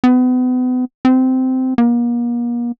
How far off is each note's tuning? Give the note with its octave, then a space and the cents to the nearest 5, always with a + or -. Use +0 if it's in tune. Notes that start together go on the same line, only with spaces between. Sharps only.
B3 +35
C4 -15
A#3 +40